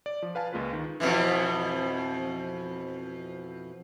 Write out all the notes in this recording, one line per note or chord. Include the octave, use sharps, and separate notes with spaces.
D5
F3
B4 F5 G#5 A5
C#2 G#3 A#3 F4 B4
D#3
F2 B2 E3